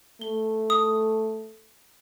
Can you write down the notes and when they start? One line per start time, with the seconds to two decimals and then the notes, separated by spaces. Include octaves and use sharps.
0.21 A3 G7
0.70 D#6